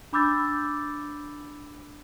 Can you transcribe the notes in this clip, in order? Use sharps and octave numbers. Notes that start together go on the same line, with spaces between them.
D4 B5 D6 E6 G6 A6